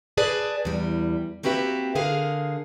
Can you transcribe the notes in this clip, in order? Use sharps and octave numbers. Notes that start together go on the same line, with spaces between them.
G#4 B4 D5 A5
E2 G3
A#3 C4 F#4 G4 B4 E5
D3 G#4 A#4 F5